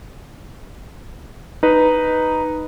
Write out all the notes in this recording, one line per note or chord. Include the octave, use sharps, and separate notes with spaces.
D#4 B4